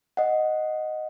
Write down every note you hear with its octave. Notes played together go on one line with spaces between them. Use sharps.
D#5 F#5